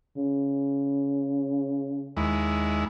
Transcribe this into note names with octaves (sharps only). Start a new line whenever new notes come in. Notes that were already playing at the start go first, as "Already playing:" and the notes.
C#3
D#2 G#3 E4